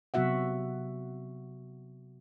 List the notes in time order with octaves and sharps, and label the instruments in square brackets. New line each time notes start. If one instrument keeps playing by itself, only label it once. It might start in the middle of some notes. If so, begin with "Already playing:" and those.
[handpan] C3 F#3 B3 F#4 E5 F#5